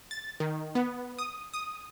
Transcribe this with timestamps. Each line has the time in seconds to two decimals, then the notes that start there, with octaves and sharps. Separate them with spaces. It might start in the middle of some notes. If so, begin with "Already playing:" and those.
0.11 A6
0.40 D#3
0.75 B3
1.19 D#6
1.54 D#6